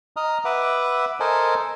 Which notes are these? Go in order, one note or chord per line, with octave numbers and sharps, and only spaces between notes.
D#5 A#5 D#6 F6
B4 E5 F#5 D6
A4 A#4 C5 D#5 G#5 A5